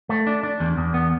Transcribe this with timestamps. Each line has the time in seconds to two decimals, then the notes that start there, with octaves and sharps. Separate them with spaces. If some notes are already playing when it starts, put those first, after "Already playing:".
0.09 A3
0.27 D4
0.43 D4
0.60 E2
0.77 E2
0.94 B3